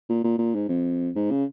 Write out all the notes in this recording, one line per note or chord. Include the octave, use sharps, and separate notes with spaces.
A#2
A#2
A#2
G#2
F2
G#2
C#3